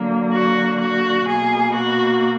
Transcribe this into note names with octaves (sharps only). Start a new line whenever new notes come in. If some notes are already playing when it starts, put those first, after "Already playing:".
Already playing: D3 F#3 A#3
F#4
F#4
B2 A#3 G#4
F#4